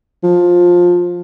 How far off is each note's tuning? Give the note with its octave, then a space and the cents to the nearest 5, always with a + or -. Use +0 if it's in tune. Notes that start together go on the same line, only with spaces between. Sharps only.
F3 +15